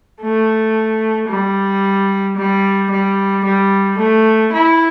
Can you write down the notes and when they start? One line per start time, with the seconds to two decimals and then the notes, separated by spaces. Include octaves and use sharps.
0.21 A3
1.29 G3
2.37 G3
2.91 G3
3.45 G3
3.99 A3
4.53 E4